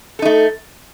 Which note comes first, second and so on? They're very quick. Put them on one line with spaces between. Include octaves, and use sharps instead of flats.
A4 D#4 A3